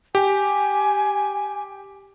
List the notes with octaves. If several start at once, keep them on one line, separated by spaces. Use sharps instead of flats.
G4 G#5